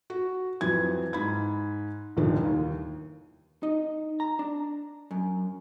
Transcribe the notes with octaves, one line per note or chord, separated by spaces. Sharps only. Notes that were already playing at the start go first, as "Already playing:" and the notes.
F#4
F2 E3 F#3 G#6
G#2 B5 G#6
F1 C2 A#2 D3 D#3
D#2
D#4
A#5
D4
F#2